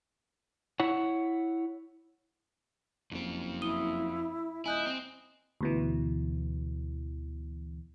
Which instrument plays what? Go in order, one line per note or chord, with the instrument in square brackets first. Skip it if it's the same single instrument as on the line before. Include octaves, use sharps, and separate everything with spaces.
[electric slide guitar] E4 C#5 F#5
[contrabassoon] F#1 [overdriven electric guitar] F2 C4
[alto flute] E4 [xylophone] D#6 D#7 G7
[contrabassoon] D#1 [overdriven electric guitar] E4 [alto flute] D#5 [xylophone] G#5 F#6 G6
[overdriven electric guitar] C4
[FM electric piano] D2 B2 E3